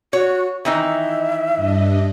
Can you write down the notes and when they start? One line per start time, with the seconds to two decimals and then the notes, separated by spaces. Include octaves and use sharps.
0.13 F#4 C#5
0.65 D#3 E3 D#4 E5
1.56 G2 D4 D#5